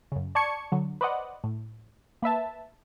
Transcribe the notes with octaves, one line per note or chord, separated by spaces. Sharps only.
F#2 C#3
D5 A5 C#6 G#6 C#7
D3 F#3
B4 C5 D5 D#5 F#5
A2
A#3 B4 E5 A5